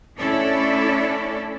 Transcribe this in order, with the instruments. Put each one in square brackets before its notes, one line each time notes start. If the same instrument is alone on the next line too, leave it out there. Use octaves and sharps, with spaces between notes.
[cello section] A3 C#4 D4 E4 A4 D5